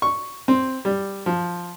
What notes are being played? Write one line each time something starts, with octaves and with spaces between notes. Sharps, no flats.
C#6
C4
G3
F3